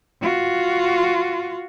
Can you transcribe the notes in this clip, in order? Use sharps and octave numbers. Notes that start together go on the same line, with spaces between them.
F4 F#4